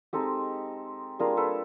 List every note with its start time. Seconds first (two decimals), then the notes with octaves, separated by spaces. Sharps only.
0.13 G#3 C4 D#4 G4 A4
1.19 G3 A#3 D4 F4 G#4 A#4
1.37 A4 B4